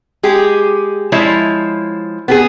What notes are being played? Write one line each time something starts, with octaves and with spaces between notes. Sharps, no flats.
G#3 G4 G#4
F3 G#3 E4 C#5 E5
B3 G4 G#4